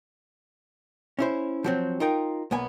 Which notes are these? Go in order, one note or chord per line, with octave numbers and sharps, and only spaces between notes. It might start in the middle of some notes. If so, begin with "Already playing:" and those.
C#4 E4 C5
F3 F#3 C4
D#4 F4 A#4 G5
B1 A#3 B3 G#5